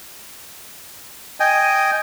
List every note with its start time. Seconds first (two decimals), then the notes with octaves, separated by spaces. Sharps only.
1.40 D#5 G5 G#5